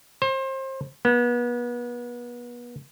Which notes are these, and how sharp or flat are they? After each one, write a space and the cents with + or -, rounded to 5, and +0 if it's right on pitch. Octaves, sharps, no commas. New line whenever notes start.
C5 +30
B3 -35